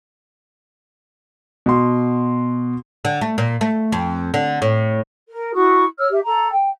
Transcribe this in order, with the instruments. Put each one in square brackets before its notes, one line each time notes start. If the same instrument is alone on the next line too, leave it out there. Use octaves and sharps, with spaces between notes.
[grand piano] B2 F#4 C6
[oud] D3
A3
A#2
A3
F2
D3
A2
[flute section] A#4
E4 F#4 C#6 D#6
C#5 E6 F6
G4 E5
A4 A#5
G5